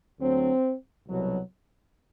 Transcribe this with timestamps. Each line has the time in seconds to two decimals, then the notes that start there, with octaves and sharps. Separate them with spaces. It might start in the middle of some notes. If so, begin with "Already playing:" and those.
0.20 D2 D3 F#3 C4
1.08 C2 B2 F#3